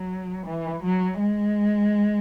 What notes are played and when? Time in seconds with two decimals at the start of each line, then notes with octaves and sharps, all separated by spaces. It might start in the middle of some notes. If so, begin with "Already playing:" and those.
Already playing: F#3
0.46 E3
0.83 F#3
1.20 G#3